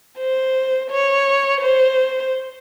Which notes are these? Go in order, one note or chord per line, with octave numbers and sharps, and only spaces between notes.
C5
C#5
C5